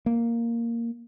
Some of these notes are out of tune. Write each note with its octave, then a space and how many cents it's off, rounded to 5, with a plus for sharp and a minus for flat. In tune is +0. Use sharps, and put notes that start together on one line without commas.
A#3 -5